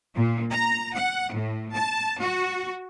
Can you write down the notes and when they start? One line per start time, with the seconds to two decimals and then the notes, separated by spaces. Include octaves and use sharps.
0.14 A#2
0.51 A#5
0.95 F#5
1.33 A2
1.74 A5
2.19 F#4